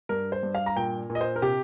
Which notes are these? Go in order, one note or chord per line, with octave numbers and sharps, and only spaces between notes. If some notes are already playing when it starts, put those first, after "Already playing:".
G2 A#4
C5
G2
F5
A#5
A#2 G5
A#2
D#5
C5
A#4
C3 G4